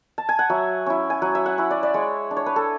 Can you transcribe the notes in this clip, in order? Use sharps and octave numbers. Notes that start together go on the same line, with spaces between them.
A5
G#5
F#5
F#3 E5
C#4 E4
G#5
F#3 F#5
E5
F#5
C#4 E4
D5
D5
G#3 C#5
D4
C#5
B4
A4